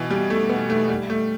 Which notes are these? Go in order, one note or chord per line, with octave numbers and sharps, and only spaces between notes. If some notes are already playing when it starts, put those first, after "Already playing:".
Already playing: B2 E3
G3
A3
B3
A3
G3
A3